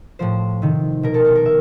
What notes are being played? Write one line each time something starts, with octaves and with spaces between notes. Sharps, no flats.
A2 F3 C5
C3 D#3
B2 A#4
A4
A4
A#4
E5